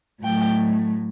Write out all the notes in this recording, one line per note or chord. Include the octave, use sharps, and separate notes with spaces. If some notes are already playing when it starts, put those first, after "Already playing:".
A2 F#3 A3 G5